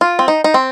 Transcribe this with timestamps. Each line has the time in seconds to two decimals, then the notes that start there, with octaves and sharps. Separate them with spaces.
0.01 F4
0.19 C4
0.28 D#4
0.44 D#4
0.54 C4